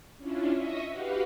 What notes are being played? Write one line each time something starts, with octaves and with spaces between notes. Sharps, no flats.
C#4 D4 E4 F4
D#5 E5 C#6 D#6 A#6 B6
F#4 G4 B4 F5 F#5